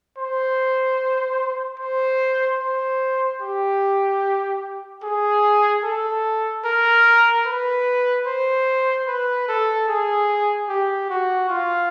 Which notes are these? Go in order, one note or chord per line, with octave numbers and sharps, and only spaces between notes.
C5
C5
C5
G4
G#4
A4
A#4
B4
C5
B4
A4
G#4
G4
F#4
F4